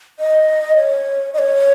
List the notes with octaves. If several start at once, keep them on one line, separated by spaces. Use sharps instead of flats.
D#5
C#5
D#5
C#5